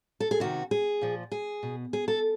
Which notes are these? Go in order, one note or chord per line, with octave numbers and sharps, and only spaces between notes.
A4
G#4
C3 D#3 F#4
G#4
A#2 F3
G#4
B2
G#4
A4